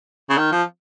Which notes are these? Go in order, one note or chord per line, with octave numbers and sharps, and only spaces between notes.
C#3
D#3
F3